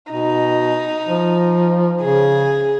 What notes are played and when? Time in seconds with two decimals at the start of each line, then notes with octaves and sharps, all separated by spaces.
0.11 B2 D#4
1.08 F3
2.01 C#3 G#4